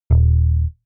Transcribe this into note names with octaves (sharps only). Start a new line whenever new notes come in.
D#1